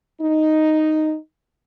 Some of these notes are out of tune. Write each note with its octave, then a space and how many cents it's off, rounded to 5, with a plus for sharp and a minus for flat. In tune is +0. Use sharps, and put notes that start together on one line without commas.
D#4 +0